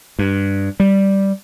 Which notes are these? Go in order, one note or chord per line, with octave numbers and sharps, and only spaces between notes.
G2
G3